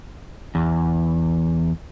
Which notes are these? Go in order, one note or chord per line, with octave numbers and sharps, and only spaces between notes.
E2